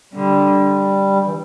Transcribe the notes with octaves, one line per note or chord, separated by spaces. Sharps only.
D3 G3
E3